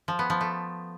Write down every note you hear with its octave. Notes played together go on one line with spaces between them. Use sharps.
F3
B3
F3
A3